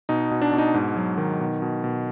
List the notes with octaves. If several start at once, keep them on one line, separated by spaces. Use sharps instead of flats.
B2 D#4
B2
D4
B2
D#4
G#2
F#3
D#3
B2
B2
B2